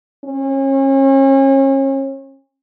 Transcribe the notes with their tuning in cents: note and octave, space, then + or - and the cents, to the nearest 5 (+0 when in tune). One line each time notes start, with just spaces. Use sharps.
C#4 -35